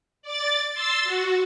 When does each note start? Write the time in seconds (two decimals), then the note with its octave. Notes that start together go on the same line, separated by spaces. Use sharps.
0.22 D5 A6
0.73 C6 E6 A6
1.03 F#4